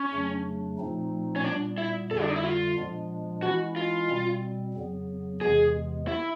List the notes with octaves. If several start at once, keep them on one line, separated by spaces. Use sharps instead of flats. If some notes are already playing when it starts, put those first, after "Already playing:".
Already playing: C#4
F2 C#3 F#3 A3 D4
A#2 F3 A3 C4 D#4
C#4
A#2 G3 B3 D4
E4
F2 D3 G3 A4
D4
D#4
E4
F4
A#2 F3 G#3 B3 D4
E3 G#3 C#4 E4 F#4
F4
B2 G3 C4
F2 C#3 F#3 B3
E2 C3 E3 G#3 B3 G#4
E4